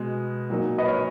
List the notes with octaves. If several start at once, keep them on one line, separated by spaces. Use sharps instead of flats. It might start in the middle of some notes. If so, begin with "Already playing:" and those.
Already playing: B2 G#3
A#2 F#3 A#3 D#4
B4 D#5
A#4 C#5